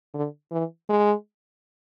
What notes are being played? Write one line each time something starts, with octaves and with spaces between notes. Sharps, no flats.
D3
E3
G#3